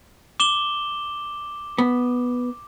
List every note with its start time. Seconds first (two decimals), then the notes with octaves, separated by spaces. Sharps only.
0.40 D6 E7 G7
1.78 B3